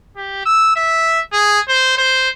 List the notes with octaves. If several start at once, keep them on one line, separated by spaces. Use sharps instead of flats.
G4
E6
E5
G#4
C5
C5